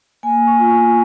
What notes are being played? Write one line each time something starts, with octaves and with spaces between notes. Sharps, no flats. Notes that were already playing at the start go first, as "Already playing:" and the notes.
A#3 G#5
C#6
F4
C#6